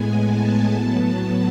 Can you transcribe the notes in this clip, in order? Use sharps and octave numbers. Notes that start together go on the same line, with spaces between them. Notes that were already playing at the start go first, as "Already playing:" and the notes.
Already playing: A2 G#3 B3 G#5
A5
A2 F#3 B3 A5
A5